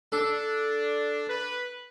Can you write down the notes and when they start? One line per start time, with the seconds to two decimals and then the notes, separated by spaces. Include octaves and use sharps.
0.12 D4 A4
1.28 B4